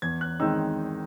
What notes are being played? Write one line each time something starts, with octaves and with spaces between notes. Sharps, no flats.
E2 G#6
F#6
D#3 G#3 C4 D#4 E6